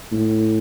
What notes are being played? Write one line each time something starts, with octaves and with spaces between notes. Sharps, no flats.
A2